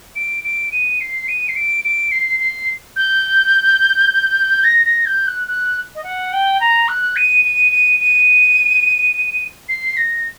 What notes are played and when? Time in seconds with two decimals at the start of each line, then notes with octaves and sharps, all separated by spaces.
0.16 D7
0.44 D7
0.72 D#7
1.01 C7
1.28 D#7
1.49 C7
1.56 D7
1.84 D7
2.11 C7
2.40 C7
2.96 G6
4.64 A#6
4.85 A#6
5.06 G6
5.27 F#6
5.48 F#6
5.95 D#5
6.04 F#5
6.33 G5
6.60 A#5
6.88 F#6
7.16 D#7
7.45 D#7
7.72 D#7
8.00 D#7
9.69 C7
9.97 A#6